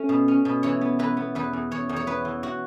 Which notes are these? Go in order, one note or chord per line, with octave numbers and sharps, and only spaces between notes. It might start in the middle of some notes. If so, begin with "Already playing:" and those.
Already playing: A3 C#4
B2
C#4
B2
E3 C#5
B3
E3 B4
B3
E2 B4
E2
E2 C#5
E2
C#5
B3 B4
E3
F#4